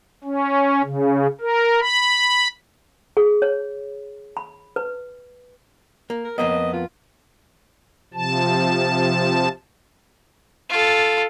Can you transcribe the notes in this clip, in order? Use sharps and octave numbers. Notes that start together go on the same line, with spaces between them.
C#4
C#3
A#4
B5
G#4
C#5
B5
B4
A#3
A#4
F2 A#3 B3 D#5
F4
C3 F3 A5
F4 A4